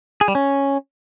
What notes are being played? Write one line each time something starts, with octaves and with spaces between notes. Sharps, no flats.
G#4
G3
C#4